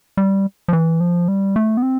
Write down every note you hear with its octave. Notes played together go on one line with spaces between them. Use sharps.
G3
F3
E3
F3
G3
A3
B3
C4